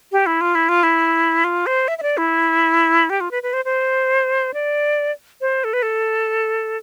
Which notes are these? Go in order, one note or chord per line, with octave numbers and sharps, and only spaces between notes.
G4
E4
F4
E4
F4
E4
F4
C5
E5
E5
D5
E4
G4
F4
B4
B4
C5
C5
D5
C5
A4
B4
A4